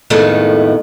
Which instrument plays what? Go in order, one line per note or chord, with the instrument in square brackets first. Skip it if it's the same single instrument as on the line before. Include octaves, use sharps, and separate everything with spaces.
[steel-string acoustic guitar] F2 A2 D#3 G#3 A3 B3